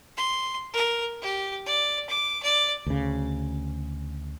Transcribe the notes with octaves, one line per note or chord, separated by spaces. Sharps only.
C6
A#4
G4
D5
D6
D5
D2 C#3